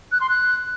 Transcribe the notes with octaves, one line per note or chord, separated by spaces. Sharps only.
F#6
C6
F#6